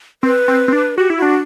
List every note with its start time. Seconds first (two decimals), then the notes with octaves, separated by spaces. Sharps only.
0.23 C4 B4
0.48 C4
0.68 C4
0.73 D4
0.98 F#4 G4
1.10 E4
1.17 F#4
1.22 D4